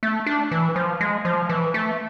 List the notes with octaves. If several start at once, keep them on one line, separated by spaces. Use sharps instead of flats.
A3
D4
E3
F3
G#3
F3
E3
A3